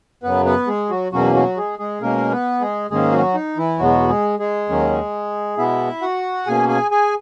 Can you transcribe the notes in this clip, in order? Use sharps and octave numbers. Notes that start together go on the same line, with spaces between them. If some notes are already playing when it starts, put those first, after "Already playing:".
F#2 C#3 F#3 B3 B4
B3 B4
G#3 G#4
F#3 F#4
E2 B2 F#3 A#3 C#4 F#4
F#3 F#4
G#3 G#4
G#3 G#4
B2 G#3 A#3 C#4 A#4
B3 B4
G#3 G#4
G#2 D#3 G#3 A#3 C#4 G#4
F#3 F#4
D#4
E3 E4
E2 B2 F#3 G#3 B3 F#4
G#3 G#4
G#3 G#4
D#2 D#3 F#3 C#4
B2 G#3 B3 E4 E5
F#4 F#5
B2 A#3 C#4 G#4 G#5
G#4 G#5
G#4 G#5